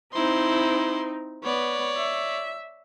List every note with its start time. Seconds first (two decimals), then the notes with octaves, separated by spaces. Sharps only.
0.13 C4 D#4 E4 C6
1.44 B3 C#5 D5
1.97 E5